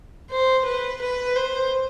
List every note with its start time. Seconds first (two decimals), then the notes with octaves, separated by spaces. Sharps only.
0.30 C5
0.65 B4
1.01 B4
1.36 C5